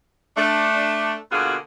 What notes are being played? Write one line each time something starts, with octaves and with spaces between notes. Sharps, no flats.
A3 D4
B2 D3 A#3 F4 F#4 G#4